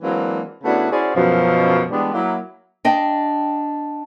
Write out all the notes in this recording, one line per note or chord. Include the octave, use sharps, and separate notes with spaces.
E3 F#3 G#3 A#3 C4 D4
C#3 A3 B3 D4 E4 F#4
C#4 E4 F#4 G#4 C5 D5
F#2 B2 F3
E3 G3 G#3 B3 D4
F#3 A#3 E4
D4 D#5 G5